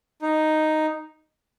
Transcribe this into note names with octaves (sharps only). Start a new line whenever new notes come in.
D#4